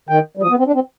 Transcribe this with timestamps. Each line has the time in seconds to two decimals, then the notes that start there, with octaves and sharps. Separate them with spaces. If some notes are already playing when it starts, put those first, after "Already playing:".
0.09 D#3 G5
0.37 G3
0.42 F3 D#6
0.50 B3
0.59 C4
0.67 D4
0.75 C4